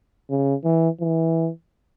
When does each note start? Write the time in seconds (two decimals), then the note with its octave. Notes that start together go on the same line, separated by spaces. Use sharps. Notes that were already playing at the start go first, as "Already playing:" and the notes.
0.30 C#3
0.64 E3
1.00 E3